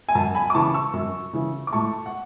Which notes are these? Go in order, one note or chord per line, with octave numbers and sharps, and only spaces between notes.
G#5
F#2 F#5 A5
G#5 B5
D6
C#3 E3 A5 C#6
C#6 E6
F#2
C#3 E3
D6
A2 A5 C#6
F#5